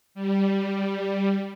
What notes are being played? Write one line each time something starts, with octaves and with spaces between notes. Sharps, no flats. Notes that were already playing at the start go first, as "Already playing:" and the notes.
G3